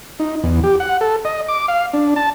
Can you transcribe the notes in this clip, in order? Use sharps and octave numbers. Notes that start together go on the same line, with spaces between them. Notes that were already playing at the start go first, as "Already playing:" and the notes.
D#4
E2
G4
F#5
A4
D#5
D6
F5
D4
A5